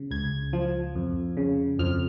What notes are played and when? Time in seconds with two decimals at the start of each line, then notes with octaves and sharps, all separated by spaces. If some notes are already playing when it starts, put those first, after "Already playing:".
Already playing: C#3
0.11 C#2 G#6
0.53 F3
0.95 F2
1.37 C#3
1.79 F2 F6